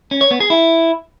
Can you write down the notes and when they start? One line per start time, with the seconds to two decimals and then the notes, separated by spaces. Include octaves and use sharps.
0.11 C#4
0.21 C#5
0.31 B3
0.40 G#4
0.50 E4